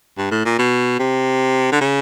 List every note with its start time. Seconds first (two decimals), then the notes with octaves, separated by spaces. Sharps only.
0.18 G2
0.31 A2
0.45 A#2
0.59 B2
0.99 C3
1.72 D3
1.81 C#3